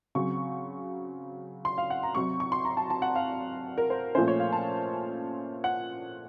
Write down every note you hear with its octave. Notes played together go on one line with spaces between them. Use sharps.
C#3 F#3 C4 C#6
C6
F5
F#5
A#5
C3 F#3 C4 C#6
C#6
C6
A#5
A5
A5
F#5
F5
A#4
C5
A#2 F3 A3 C#4 C5
C#5
F5
A5
F#5